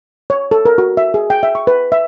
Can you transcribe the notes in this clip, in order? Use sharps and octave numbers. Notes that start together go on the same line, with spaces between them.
C#5
A4
A#4
F#4
E5
G#4
G5
E5
C#6
B4
E5